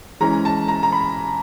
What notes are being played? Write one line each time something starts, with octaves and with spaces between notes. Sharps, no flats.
E3 G#3 C#4 A#5
A5
A#5
A#5
B5